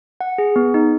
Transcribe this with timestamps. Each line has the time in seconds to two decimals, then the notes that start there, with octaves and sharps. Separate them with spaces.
0.21 F#5
0.38 G#4
0.56 B3
0.74 D#4